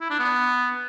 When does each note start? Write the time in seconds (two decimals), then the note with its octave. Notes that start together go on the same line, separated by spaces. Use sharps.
0.01 E4
0.10 D4
0.19 B3